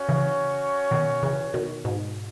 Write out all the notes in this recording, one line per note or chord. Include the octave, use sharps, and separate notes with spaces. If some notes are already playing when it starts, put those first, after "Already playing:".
Already playing: C#4 F#4 C#5
C#3 E3
B2 D#3
C#3 E3
B2 D#3
G#2 B2